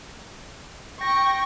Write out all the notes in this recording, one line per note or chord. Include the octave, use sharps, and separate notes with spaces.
G5 C#6 A#6